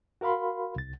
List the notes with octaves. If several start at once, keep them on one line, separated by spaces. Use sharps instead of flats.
F#4 A#4 F5 B5 C6
C2 A6